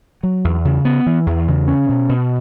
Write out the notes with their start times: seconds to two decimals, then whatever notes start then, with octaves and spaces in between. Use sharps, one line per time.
0.23 F#3
0.44 E2
0.65 C#3
0.85 B3
1.06 E3
1.27 E2
1.48 C#3
1.68 C#4
1.89 B2
2.09 B2